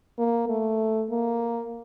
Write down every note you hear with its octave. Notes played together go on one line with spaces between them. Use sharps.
A#3
A3
A#3